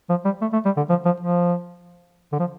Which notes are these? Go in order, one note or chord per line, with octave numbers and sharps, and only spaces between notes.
F3
G3
A3
A3
G3
D3
F3
F3
F3
D3
F3